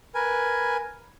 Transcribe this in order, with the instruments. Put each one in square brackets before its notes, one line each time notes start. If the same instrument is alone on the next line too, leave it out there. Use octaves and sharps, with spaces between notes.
[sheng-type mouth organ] A#4 B4 G#5